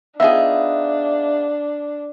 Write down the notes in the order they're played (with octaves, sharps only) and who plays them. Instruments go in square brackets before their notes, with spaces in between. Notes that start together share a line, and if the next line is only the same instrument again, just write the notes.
[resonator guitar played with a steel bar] B3 G#4 [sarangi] D4 [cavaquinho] D#4 F4 [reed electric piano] E5